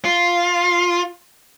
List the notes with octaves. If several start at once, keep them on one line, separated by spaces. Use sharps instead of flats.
F4